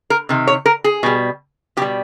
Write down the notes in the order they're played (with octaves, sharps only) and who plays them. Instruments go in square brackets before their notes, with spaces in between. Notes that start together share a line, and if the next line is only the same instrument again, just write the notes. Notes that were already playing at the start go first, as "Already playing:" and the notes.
[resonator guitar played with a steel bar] A#4
C3 D#3
C#5
A#4
G#4
B2 G3
B2 G4
G3